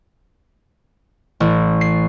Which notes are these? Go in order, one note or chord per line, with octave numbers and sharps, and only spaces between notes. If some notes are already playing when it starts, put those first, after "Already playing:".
A1
C7